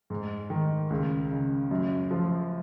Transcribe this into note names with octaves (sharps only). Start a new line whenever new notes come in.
G#2
D#3
C#2
C#3
F#2
F3